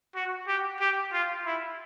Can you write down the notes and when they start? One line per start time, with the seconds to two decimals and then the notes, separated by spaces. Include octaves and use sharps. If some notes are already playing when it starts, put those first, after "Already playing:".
0.15 F#4
0.47 G4
0.80 G4
1.13 F4
1.46 E4